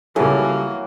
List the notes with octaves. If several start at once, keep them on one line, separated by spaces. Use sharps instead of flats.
C#2 E3 F#3 G3 A#3 G#4 A4